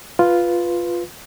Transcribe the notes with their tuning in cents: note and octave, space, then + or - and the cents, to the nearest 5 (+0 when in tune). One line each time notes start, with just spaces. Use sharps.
F4 +0 B4 +0